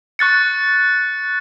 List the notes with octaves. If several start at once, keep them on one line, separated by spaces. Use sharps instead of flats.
C#6 F#6 A6 C#7